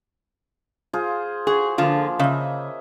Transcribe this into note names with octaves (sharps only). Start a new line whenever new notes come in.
F4 G#4 C5
F#4 G#4
D3 F3 A#3 F4
C#3 D#5 E5